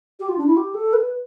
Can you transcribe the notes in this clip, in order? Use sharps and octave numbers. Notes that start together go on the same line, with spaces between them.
G4
F4
D4
E4
G4
A4
B4